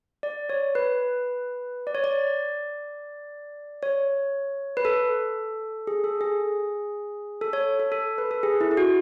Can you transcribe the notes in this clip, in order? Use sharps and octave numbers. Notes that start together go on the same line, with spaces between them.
D5
C#5
B4
D5
C#5
D5
C#5
B4
A4
G#4
A4
G#4
A4
C#5
A4
A4
B4
A4
G#4
E4
E4
F#4